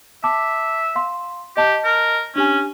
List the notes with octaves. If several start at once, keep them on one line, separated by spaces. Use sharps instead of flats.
E5 A5 D6
F5 C6
G4 D#5 A5
A#4
C#4 D4 G4 G#5